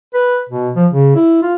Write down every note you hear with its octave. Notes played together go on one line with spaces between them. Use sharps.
B4
B2
F3
C#3
E4
F4